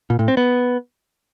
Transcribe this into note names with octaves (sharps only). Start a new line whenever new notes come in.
A#2
A2
C4
B3